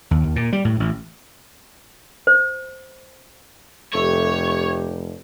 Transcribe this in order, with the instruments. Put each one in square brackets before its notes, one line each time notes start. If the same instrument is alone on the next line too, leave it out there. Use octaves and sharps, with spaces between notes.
[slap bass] D#2
D#2
A#2
G3
A2
A1
[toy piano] C5
[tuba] F1 [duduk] G4 [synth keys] A4 E5 C#6 [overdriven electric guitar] C#5